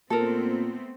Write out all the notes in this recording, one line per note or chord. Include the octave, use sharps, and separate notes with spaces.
A#2 A3 B3 C4 A4 A#4